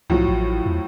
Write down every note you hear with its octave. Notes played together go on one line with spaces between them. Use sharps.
C2 A2 F3 F#3
A1
E2